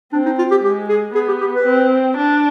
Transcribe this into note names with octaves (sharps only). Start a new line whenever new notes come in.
C4 D4
D#4
F4
G4
G#3 G4
G#4
B3 G#4
G4
G4
B4
C4
D4